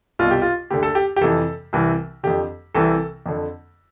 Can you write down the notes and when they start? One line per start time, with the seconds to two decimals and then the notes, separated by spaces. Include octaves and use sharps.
0.19 C2 B2 F4
0.31 G4
0.42 F4
0.70 D2 D3 G4
0.83 A4
0.95 G4
1.16 G4
1.21 F2 C3 E3 A4
1.73 C2 C3 E3
2.23 F2 D3 G4
2.74 C2 C3 E3 A4
3.26 F2 D3